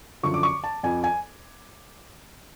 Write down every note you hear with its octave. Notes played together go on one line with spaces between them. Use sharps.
F#2 D3 F3 C#6
D6
C#6
A5
F2 F3 G#5
G#5